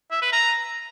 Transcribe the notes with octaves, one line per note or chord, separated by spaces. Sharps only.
E5
B4
A#5